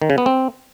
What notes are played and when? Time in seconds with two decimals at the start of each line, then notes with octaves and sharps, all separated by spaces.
0.02 D#3
0.10 C#3
0.18 B3
0.26 C4